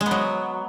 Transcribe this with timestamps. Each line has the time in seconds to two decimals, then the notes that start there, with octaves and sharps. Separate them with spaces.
0.01 G#3
0.06 B3
0.11 F#3